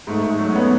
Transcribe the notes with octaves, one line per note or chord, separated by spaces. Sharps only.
G#2 A3
G#2 A3
F#3 A3
C#4
B3